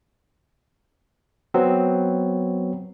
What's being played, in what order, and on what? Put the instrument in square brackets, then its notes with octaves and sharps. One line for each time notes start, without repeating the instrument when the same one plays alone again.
[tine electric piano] F#3 B3 C4